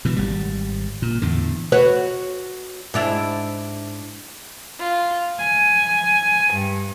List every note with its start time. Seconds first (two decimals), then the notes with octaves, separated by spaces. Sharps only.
0.05 B2 E3
0.17 G#1 G3
1.02 A#2
1.22 E2 A2 D3
1.72 F#4 B4 C#5
2.94 G#2 D4 E4
4.79 F4
5.37 G#5
6.54 G2